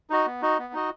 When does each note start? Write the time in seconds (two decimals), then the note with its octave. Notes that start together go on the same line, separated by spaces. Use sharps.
0.10 D#4 F#4 D#5
0.26 B3
0.42 D#4 F#4 D#5
0.58 B3
0.73 D#4 F#4 D#5